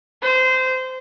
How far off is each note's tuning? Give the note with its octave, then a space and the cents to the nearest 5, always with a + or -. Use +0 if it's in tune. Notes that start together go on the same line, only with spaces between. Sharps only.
C5 -20